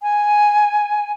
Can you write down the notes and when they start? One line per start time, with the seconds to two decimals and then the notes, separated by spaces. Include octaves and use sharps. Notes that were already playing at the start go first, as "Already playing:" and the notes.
0.02 G#5